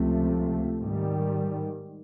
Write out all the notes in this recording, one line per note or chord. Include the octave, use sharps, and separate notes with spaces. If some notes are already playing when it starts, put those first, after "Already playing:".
Already playing: C#2 C3 F3 A3
G#2 D#3 G3